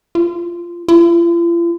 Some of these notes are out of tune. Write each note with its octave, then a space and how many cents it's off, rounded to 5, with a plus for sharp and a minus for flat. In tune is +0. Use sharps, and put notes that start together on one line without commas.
F4 -15
F4 -45